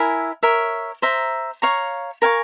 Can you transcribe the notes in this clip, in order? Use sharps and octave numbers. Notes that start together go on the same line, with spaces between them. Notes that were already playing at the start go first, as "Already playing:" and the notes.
Already playing: E4 A#4 E5 G#5
A#4 C#5 E5
C5 E5 A#5
C#5 F5 A#5 C#6
A#4 F5 G#5 C#6